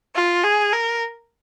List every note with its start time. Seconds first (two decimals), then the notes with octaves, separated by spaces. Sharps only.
0.15 F4
0.44 G#4
0.72 A#4